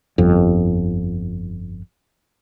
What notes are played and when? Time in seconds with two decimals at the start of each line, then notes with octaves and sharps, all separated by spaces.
0.18 G1 F2